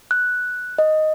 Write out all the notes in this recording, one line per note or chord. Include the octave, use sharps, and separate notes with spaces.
F#6
D#5